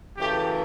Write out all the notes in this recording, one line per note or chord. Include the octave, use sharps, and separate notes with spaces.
F#2 C#3 E3 A3 G4